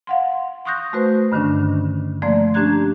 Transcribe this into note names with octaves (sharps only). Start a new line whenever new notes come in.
F5 F#5 C6
C6 C#6 D#6 F#6 G6 A#6
A3 F#4 B4 C5
G2 D3 D#3 C#4 D4
F3 A3 A#3 D5 C6
C#4 D4 G4 A#5 F#6 G#6